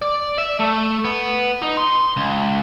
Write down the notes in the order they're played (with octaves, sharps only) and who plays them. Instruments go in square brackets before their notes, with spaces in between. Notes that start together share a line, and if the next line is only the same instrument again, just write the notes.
[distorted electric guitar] D5
E5
A3
B3
D#4
C6
C#2